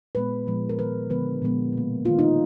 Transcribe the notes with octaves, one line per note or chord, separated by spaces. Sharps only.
A#2 G#3 B3 B4
A#2 F3 G#3 B3
A#4
D#3 G#3 B3 B4
D3 F3 G#3 B3 B4
A#2 F3 G#3 B3
B2 A#3
D#3 A#3 F4
D#4